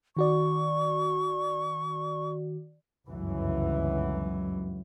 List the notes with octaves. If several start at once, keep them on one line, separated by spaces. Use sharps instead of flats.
D#3 F#4 D5 C#6
G1 C#2 F#2 E3 F#3